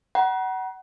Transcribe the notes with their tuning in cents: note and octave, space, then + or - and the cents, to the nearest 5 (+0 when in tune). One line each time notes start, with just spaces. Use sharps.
F#5 +25 A#5 +45